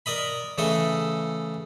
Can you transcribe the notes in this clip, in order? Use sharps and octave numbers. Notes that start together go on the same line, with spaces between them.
A#4 D5 D#5 B5
C#3 E3 A3 A4 D#5